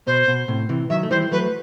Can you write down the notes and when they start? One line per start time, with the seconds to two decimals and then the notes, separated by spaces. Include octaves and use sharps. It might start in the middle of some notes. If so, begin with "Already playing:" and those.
0.07 B2 C5
0.28 B2
0.48 A2 C3
0.69 C3 E3
0.90 D#3 F#3 E5
1.03 A3
1.11 E3 G3 C5
1.32 F#3 A3 B4